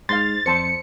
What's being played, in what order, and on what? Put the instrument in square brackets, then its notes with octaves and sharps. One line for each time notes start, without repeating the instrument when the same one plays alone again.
[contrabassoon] G#2 [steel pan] F5 C6 [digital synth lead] A6
[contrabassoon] F2 [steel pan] C5 A5 C6 [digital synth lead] C#7